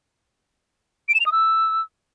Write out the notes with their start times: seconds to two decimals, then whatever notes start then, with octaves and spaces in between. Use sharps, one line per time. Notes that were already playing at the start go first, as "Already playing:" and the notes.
1.08 D7
1.14 E7
1.20 F7
1.26 D#6
1.32 E6